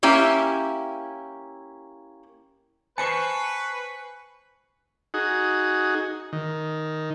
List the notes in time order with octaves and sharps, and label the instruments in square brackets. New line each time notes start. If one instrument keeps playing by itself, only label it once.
[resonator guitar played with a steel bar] A#3 C#4 E4 G4
[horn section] B4 [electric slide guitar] C5 A5 [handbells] G#5 [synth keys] C#6 C7 C#7
[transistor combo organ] D#4 F#4 G#4
D#3